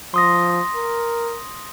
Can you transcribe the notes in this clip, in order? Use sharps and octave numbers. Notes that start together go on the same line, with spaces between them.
F3 C6 D#6 A#6
A#4